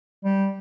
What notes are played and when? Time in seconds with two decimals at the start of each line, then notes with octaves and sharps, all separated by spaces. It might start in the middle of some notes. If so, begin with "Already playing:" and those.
0.24 G3